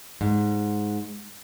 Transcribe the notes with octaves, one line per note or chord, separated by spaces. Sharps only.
G#2